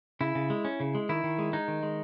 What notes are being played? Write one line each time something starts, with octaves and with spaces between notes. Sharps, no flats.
C#3 E4
C#3
G#3
C#4
C#3
G#3
D#3 E4
D#3
G#3
G#3 D#4
D#3
G#3